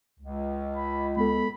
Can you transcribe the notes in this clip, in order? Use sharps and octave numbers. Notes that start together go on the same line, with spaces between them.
C#2
B5
G#3 B3 A4 B5